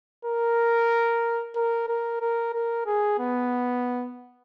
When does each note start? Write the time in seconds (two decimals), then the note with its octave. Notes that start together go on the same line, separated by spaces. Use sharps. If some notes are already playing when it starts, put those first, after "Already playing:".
0.25 A#4
1.56 A#4
1.88 A#4
2.21 A#4
2.53 A#4
2.86 G#4
3.19 B3